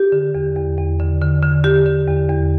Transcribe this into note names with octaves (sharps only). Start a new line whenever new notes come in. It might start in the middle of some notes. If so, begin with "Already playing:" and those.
Already playing: G4
D3
E2
E2
E2
D3
D3
D3
D3 G4
D3
E2
E2